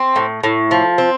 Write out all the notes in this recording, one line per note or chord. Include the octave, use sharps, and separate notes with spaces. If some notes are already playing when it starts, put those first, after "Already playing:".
Already playing: C4
A2
A2
F3
C4